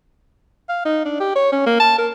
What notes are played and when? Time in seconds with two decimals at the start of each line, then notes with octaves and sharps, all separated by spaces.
0.69 F5
0.85 D#4
1.05 D4
1.20 G4
1.35 C#5
1.52 C#4
1.66 A#3
1.79 A5
1.98 A#4